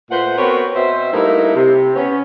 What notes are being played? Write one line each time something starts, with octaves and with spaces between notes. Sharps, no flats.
A#2 A3 B4 C5 F#5
B3 C4 F#4 A#4 B4 C#5
B2 C4 C5 E5
G2 A3 A#3 D#4 E4
C3
B3 C#4